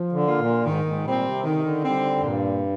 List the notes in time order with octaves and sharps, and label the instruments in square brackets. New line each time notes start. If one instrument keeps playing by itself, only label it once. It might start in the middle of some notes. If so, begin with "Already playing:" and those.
Already playing: [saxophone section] F3
[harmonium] D3
[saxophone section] A#3 F4
[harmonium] A#2
[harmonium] G#2 [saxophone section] D#3
[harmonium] G#2
[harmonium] A#2 [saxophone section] G3 C4
[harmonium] C3
[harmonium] D3 [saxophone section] D#3
[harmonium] C3
D3
[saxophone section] G3 C4
[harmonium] F2
[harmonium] G2 [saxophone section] A#2